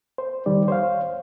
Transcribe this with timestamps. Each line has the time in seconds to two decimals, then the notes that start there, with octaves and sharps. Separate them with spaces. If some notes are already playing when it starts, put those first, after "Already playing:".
0.18 C5
0.46 F2 D#3 G3 D5
0.68 C5 C#5 F5